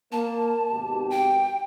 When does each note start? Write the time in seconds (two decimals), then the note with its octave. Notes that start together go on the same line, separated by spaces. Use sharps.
0.12 A#3 A5
0.72 G#1 B2 G4
1.10 G5